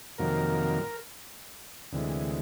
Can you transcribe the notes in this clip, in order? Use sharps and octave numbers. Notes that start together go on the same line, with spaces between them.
F2 C3 D#3 F#3 A#3 A#4
D2 C3 E3 G#3